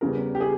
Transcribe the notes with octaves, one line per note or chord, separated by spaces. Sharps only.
E2 C#3 G3 A#4
G4
G#4